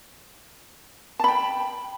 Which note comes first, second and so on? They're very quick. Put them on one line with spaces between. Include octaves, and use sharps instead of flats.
A5 B5 G5